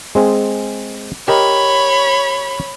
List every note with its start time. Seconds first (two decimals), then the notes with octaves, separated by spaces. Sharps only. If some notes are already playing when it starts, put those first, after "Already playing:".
0.15 G#3 C4 G#4
1.28 G4 A#4 C#5 D#5 B5